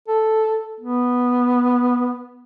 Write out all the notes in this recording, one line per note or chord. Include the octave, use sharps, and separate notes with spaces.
A4
B3